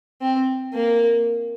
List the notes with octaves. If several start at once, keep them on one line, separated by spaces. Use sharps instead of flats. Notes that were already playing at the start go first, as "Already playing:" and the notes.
C4
A#3